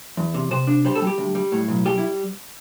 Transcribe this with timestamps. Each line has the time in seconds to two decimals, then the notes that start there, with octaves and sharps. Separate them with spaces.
0.17 E2
0.34 C3
0.51 C3 C5
0.67 D4
0.85 G3 C5
0.95 A4
1.02 G3
1.07 G4
1.18 D2
1.35 G3
1.52 A2
1.68 B1
1.86 G3 G4
1.98 E4